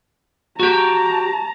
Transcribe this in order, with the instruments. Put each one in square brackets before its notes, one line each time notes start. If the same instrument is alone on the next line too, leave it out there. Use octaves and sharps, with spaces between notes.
[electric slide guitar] F#4 G4 [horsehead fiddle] A5 A#5